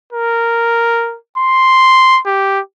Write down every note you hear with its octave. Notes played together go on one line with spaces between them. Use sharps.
A#4
C6
G4